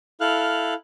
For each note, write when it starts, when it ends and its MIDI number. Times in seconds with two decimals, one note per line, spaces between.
0.21 0.74 64
0.21 0.74 69
0.21 0.74 77
0.21 0.74 89
0.21 0.74 90